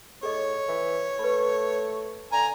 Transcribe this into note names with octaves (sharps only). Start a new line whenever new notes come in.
A2 G#4 A4 C#5 D#5
E3
A3 B4 B5
D3 G#5 A#5